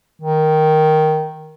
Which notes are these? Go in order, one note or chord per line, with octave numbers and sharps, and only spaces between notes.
D#3